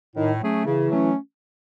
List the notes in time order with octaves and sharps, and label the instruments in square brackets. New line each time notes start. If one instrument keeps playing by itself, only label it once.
[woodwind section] A2 [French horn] D#3
[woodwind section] F#3 A3 C#4 G#4
[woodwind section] C#3 [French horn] E3
[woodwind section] F#3 A3 C#4